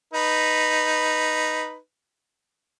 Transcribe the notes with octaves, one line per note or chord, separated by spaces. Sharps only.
D#4 B4